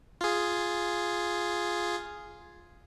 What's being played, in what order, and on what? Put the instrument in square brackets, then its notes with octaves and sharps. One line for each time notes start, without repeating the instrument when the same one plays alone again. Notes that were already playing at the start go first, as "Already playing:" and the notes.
[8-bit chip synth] F4 G#4